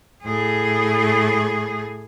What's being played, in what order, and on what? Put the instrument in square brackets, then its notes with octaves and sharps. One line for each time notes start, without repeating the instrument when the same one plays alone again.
[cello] A2 G#4